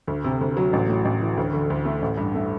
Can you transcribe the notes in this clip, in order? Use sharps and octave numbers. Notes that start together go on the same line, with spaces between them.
D2
C3
D2
F#3
A1
A2
A1
E3
D2
D3
D2
A3
A1
G2
A3